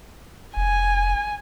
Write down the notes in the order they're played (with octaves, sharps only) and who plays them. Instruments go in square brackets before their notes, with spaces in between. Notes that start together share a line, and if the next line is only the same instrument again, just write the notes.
[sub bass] F1 [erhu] G#5